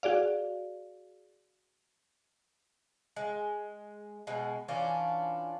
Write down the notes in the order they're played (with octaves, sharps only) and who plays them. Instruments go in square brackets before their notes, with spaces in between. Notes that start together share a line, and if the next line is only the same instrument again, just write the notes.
[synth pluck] F#4 G#4 D5 F5
[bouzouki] G#3
B2 G#3
E3 C#4 D4 F4